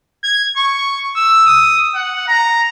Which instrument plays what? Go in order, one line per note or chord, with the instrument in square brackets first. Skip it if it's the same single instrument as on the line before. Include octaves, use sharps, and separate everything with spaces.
[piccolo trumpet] G#6
C#6
E6
D#6
F#5
A#5